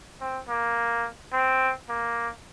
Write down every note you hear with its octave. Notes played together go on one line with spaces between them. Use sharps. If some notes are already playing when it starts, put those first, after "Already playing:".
C4
A#3
C4
A#3